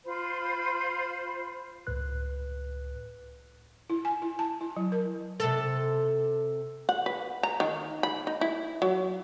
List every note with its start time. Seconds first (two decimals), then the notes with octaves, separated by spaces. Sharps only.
0.05 F4 C5 B5
1.87 C#2 A2 B4 F#6
3.90 E4
4.05 G#5
4.22 E4
4.39 A5
4.61 E4
4.76 F#3
4.92 A#4
5.40 C3 A4
6.89 F#5
7.06 B4
7.43 A#5
7.60 D#3
8.03 B5
8.27 D#4
8.41 E4
8.82 F#3